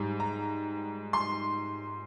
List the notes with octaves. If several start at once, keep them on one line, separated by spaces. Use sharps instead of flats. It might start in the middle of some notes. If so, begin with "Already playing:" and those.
Already playing: G#2 G3
A#5
C6